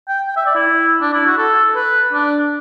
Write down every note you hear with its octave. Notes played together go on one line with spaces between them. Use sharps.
G5
G5
E5
D5
E4
D4
E4
F#4
A4
B4
D4